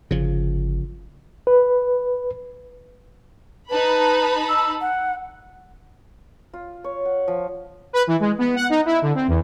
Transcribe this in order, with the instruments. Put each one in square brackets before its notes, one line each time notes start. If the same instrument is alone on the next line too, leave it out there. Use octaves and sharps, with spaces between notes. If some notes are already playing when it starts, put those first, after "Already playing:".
[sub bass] G1 [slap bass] C#3 F3
[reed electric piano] B4
[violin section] D#4 A5 B5 [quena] B4
[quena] E6
F#5
[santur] F4
C#5
F#5
F3
[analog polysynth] B4
E3
G#3
B3
F#5
D#4
E4
D3
C4
E2